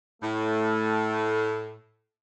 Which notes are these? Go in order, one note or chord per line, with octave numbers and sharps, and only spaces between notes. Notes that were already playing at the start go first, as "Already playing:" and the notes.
A2 A3